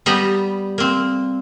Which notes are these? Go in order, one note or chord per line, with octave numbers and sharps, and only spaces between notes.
G3 B3 G4 A#5
A#3 C4